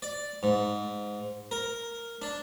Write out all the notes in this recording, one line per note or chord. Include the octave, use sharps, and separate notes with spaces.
D5
G#2
A#4
D4